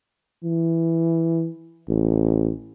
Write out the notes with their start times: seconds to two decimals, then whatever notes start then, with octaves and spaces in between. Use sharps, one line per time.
0.44 E3
1.89 A1